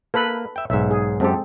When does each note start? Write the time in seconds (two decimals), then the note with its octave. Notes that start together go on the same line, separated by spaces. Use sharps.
0.14 A#3 A4 B4 B5
0.56 E5 G5
0.70 B1 G#2 E5
0.91 G#4
1.20 F#2 G#3 C4 G4 A4